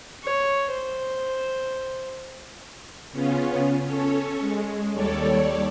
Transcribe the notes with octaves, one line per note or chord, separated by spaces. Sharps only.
C#5
C5
C#3 B3 C#4 F4
C#4 A4 C#5
G#3
D#2 G3 A4 C#5 D5